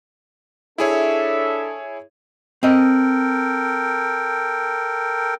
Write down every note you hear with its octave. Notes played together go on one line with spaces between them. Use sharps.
D4 E4 G#4 A4 C#5 E5
C4 A4 A#4 D#5 G5